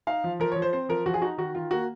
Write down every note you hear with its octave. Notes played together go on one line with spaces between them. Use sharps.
D#4 F5
F3
F3 A#4
C#5
F3
C5
C4 C5
F3 A#4
F3 F#4
G#4
D#4 F#4
D#3 F#4
D#3 F4
A#3 F#4